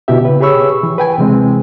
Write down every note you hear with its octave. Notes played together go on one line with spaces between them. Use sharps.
B2 D3 E4 G4 E5
C#3 B4
G4 G#4 C#5 B5 C#6 E6
E3
B4 G5 G#5
C3 E3 G#3 C4